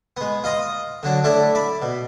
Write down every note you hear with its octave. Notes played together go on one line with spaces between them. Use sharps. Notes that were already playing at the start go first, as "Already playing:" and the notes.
G#3 B3
F4 D#5 A#5 D#6
D3 F#3 D4
A3 D4 E4 A4 D5 E5
D5 E5 B5
B2